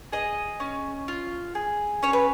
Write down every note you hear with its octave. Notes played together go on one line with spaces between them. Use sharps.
G#4 D#5
C#4
F4
G#4
C#4 C#5
B4